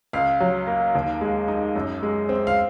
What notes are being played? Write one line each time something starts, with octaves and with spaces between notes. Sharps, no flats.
C#2 F5
F#3
A#3
D#2
G#3
D#4
F#2
G#3
C4
F5